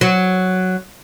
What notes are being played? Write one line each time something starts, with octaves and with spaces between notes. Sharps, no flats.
F#3